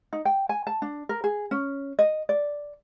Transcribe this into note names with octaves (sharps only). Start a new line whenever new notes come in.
D#4
G5
G#5
A5
D4
A#4
G#4
C#4
D#5
D5